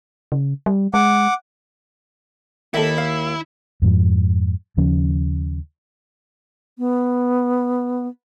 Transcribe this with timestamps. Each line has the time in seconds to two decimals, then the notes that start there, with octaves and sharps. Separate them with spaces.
0.32 C#3
0.66 G3
0.94 G#3 F#5 D6
2.74 D#2 D#3 E4 A4 D#5 E5
2.98 F5
3.82 F2 G#2 F3
4.77 D#2 C#3 F3 C#4
6.78 B3